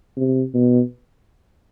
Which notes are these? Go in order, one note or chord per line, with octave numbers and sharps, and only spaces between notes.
C3
B2